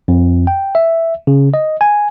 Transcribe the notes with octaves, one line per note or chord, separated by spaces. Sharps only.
F2
G5
E5
C#3
D#5
G#5